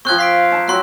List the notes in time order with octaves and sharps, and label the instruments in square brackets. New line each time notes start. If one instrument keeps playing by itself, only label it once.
[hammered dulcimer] F3 C4 [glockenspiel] C#6 F#6 G#6
[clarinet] F5 [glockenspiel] C6 B6 D7
[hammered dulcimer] A5 A#5
[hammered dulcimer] F#3 C4 F#4 [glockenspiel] C6 F#6